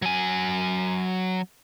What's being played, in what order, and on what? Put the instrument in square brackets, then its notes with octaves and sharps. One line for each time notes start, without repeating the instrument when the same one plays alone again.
[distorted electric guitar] F#3 G#5